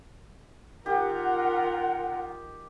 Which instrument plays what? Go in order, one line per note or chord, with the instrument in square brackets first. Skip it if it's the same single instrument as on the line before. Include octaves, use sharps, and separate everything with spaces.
[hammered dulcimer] D#3 G4 [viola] F4 A#4 [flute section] F#5